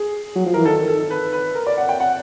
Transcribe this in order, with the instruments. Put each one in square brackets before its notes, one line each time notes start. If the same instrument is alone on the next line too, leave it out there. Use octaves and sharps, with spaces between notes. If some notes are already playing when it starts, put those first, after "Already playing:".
Already playing: [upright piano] G#4
[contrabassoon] F#3
F3
[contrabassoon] E3 [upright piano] A#4
[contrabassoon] D#3 [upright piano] A4
[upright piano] A4
B4
B4
A#4
D5
F#5
G5
F#5